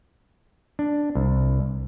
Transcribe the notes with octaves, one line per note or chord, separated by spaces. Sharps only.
D4
C2